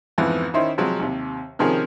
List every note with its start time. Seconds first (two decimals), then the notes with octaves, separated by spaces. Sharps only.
0.18 F2 G#2 E3 F3 B3
0.54 D#3 C#4 D#4 E4 C5
0.78 C3 F3 F#3 G#3 C4
0.99 D#2 C3
1.59 C3 D#3 F3 C#4 G#4 A#4